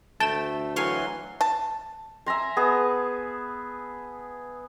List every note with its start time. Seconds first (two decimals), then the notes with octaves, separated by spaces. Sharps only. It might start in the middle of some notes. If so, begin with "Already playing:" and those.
0.20 D2 A3 G5 A5 E7
0.76 E3 F#3 C#5 F5 G#5 C6
1.41 A5
2.26 E5 G#5 A#5 C6
2.57 B3 G#4 A5